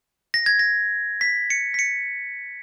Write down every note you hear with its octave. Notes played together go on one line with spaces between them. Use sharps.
A#6
G#6
A#6
B6
C#7
B6
C#7